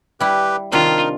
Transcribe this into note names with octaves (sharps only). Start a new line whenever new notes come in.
G3 E4 G4 B4
C3 D#3 D4 D#4 F4 A#4